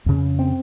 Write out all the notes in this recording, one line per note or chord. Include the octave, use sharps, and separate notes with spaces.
F2 C#3
C4